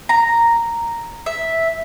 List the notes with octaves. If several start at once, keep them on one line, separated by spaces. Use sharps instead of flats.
A#5
E5